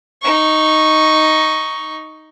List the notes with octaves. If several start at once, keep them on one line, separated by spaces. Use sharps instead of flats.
D#4 C#6